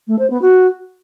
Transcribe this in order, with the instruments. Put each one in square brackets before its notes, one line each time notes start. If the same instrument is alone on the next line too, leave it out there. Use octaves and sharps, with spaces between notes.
[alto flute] A3
C5
B3
F#4